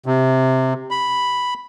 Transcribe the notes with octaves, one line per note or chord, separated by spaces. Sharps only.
C3
B5